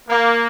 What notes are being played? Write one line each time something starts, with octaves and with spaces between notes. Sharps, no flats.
A#3